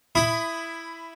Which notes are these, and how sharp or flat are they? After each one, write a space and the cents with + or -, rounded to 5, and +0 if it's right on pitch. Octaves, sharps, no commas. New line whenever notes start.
E4 +5 B5 +20 D#6 +0